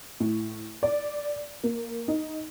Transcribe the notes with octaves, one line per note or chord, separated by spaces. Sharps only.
A2
D5
A#3
D#4